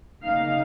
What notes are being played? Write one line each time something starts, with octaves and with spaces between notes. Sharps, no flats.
C#3 A#3 D#4 F5